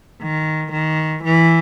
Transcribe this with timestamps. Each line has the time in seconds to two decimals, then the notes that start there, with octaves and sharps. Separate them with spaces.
0.22 D#3
0.73 D#3
1.24 E3